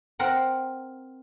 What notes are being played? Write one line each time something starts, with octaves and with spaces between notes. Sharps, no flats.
C4 A#4 F#5